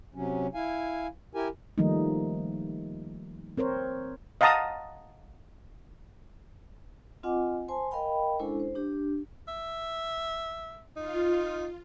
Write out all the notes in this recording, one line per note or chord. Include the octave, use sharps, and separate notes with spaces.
C3 F#3 C#4
E4 F5 G#5
E4 G4 A#4 G#5
D#3 F3 G3 A3 A#3 D#4
C4 A#4 C5 C#5
D#5 F5 F#5 A5 A#5 D#6
C4 F4 D#5 F#5 G#5 D6
C5 G#5 A5 C6
A#4 D#5 F5 G5 B5
G#3 C#4 D4 E4 A4 C5
C5
D4 G4
E5
D#4 F4